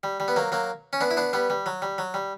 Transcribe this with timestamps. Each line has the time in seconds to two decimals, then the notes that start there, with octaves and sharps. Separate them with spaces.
0.03 G3
0.20 G3
0.28 B3
0.36 F#3 A#3
0.52 F#3 A#3
0.93 C#4
1.01 B3 D4
1.11 E4
1.17 B3 D4
1.33 G3 B3
1.50 G3
1.66 F#3
1.82 G3
1.98 F#3
2.14 G3